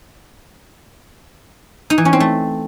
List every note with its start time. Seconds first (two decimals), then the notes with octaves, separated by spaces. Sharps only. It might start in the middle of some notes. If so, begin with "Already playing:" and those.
1.90 D#4
1.98 E3
2.05 C#4
2.13 C4
2.20 A3